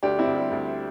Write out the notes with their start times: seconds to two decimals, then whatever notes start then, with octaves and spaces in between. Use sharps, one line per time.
0.03 D2 D4 G4
0.19 C4 E4
0.27 D2
0.36 G3
0.51 D2